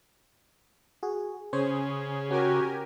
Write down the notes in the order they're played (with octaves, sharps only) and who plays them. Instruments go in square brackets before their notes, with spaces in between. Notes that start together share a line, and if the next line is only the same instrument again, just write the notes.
[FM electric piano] F#4 G#4
[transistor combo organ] C#3 [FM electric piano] C#4 C5 C#5 [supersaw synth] G#4
[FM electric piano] C#4 [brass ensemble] F#4 [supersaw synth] G4 A#4 G#5